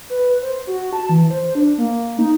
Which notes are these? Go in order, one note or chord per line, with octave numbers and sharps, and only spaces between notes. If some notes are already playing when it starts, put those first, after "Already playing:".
B4
C5
F#4
A5
E3
C5
D4
A#3
D#4